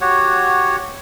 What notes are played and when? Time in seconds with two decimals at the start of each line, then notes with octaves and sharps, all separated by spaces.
0.01 F#4 G4 C#5 F#5